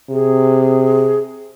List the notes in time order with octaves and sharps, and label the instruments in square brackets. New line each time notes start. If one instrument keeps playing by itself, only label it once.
[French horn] C3 [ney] G#4